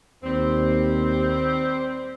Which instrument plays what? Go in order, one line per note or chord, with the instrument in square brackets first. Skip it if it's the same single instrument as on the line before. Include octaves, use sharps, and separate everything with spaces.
[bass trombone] D#2 [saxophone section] G3 C4